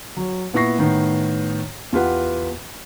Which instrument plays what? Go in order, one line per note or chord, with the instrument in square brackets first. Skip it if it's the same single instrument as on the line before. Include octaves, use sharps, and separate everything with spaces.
[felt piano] F#3
A#2 B3 E4 C#6 A#6 C7
A2 D#3 B3
E2 F4 G4 B4 F#5